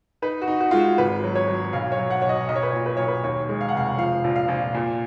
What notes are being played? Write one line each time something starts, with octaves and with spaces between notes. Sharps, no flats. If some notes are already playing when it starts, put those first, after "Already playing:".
D#4 B4
F#4
D#4
F#4
G#3 F4
F#4
G#1 B4
F#3
C#5
F#3
B1 F5
C#5
F#3
F#5
B1 C#5
D#5
B1 D#5
C#5
B4
A#2 C#5
B4
B1 C#5
B4
D#2 C#5
G#3
F5
F#5
F1 F5
F3 F5
A#1
F5
A#1
A#2